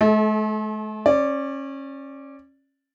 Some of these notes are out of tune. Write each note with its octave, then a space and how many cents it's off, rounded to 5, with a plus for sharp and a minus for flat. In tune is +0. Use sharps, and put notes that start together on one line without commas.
A3 -45 A4 -20
C#4 -25 D5 +0